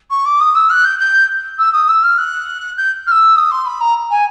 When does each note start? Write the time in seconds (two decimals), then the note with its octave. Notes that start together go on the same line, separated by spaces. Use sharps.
0.10 C#6
0.25 D6
0.40 D#6
0.55 E6
0.70 F#6
0.84 G6
0.99 G6
1.58 E6
1.73 D#6
1.88 E6
2.03 F6
2.18 F#6
2.77 G6
3.07 F6
3.11 E6
3.36 D#6
3.51 C6
3.66 B5
3.80 A#5
4.10 G#5